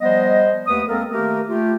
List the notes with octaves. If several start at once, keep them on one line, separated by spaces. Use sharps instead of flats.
F3 G3 B3 C5 D#5
D#2 A3 B3 B4 D#6
G#3 A#3 C4 A4 A#4
D#3 A3 A#3 G4 A#4
A3 F4 G4